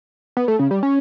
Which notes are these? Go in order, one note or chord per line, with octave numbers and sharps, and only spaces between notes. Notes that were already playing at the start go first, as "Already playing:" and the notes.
B3
A3
C#3
G3
C#4